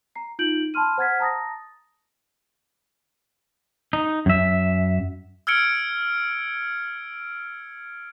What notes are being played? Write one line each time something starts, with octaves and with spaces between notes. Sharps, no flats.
A#5 C7
D#4 F4 G6 D7 F#7
A5 B5 C6 F6 D#7
C5 F#5 F6 G#6 A6 B6
A5 A#5 D#6 A6 A#6
D#4
F#2 E5
E6 F6 G#6 C#7 D7